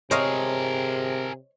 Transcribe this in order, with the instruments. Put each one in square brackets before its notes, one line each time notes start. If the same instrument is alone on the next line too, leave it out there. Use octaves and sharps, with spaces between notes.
[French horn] C3 [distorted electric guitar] G#4 A#4 [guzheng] C5 D#5 F5 [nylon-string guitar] C#5